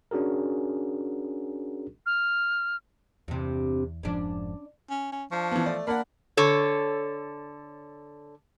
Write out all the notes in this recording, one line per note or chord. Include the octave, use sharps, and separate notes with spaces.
C#4 D4 F#4 G#4 A#4
F6
E2 G2 C3
F1 G#2 F3 C#4 D4
C#4
C#4
F3 D4 C#6
E3 B3
A3 D5
A#3 D4 A#4 D5 F#5 B5
D3 A4 C#5